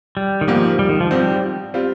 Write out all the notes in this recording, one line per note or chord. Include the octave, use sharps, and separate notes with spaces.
G3
D#3
G#2 F3 G3 A#3
G3
D#3
F3
G#2 F3 G3 C4
G3 C4 F4